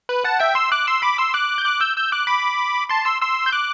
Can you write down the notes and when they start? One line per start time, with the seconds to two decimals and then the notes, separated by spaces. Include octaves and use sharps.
0.09 B4
0.24 F#5 A5
0.40 E5 G5
0.55 C6 E6
0.72 D6 F#6
0.87 C6 E6
1.02 B5 D6
1.18 C6 E6
1.34 D6 F#6
1.58 G6
1.65 D6 F#6
1.80 E6 G6
1.96 E6 G6
2.12 D6 F#6
2.27 B5 D6
2.89 A5 C6
3.05 C6 E6
3.21 C6 E6
3.46 G6
3.52 D6 F#6